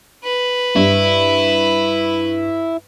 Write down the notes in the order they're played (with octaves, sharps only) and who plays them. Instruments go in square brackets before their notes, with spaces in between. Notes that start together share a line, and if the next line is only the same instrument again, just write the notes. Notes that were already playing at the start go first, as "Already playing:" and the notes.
[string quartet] B4
[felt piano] G2 [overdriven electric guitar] E4